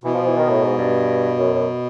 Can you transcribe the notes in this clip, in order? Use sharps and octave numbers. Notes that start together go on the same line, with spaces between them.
B2 E3
F3
E3
D#3
A2
G#2
G2
F#2
F#2